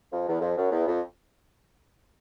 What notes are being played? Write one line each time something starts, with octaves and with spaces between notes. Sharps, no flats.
F2
E2
F2
F#2
E2
F2